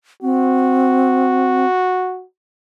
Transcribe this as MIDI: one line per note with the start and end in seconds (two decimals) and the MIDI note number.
0.23 1.66 60
0.23 2.24 66